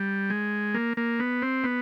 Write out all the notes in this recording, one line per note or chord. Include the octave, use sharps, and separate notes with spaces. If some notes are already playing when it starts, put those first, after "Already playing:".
Already playing: G3
G#3
A#3
A#3
B3
C4
B3